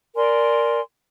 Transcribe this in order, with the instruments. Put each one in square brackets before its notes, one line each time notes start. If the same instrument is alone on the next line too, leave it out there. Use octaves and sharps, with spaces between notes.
[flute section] A#4 D5 G#5 C6